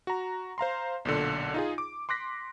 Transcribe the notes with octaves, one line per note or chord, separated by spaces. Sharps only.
F#4 A#5
C5 F5 A#5 C6
B1 A#2 D3
D#4 F4 G#4
D6
C6 D6 F#6 A#6 B6